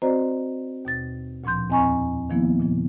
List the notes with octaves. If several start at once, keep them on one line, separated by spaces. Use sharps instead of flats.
C4 F#4 C5 D5 D#5 A#5
D#2 B2 A6
D2 A#2 F3 C6 G6
E2 C4 D#5 G#5 A#5 C#6
D#3 F3 A#3 B3 E4
A#2 C#3 F3